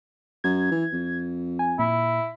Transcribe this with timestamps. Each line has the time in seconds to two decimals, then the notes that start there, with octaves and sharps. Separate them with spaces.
0.44 F#2 G#6
0.71 E3
0.93 F2
1.59 G#5
1.79 A#2 E4